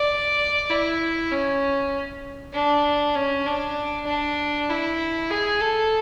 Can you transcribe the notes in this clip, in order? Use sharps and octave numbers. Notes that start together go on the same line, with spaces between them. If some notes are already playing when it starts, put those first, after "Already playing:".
Already playing: D5
E4
C#4
D4
C#4
D4
D4
E4
G#4
A4